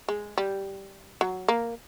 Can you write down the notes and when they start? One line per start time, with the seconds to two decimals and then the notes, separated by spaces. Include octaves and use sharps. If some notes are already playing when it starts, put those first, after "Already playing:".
0.08 G#3
0.38 G3
1.21 F#3
1.48 A#3